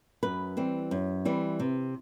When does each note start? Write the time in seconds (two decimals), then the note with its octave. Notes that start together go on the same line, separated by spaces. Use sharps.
0.23 F#2 B4
0.57 E3 G3 C4
0.91 F#2
1.25 E3 G3 C4
1.59 C3